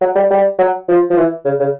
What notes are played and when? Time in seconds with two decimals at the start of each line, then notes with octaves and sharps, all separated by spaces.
0.01 F#3
0.15 G3
0.30 G3
0.58 F#3
0.88 F3
1.10 F3
1.17 E3
1.45 C#3
1.59 C#3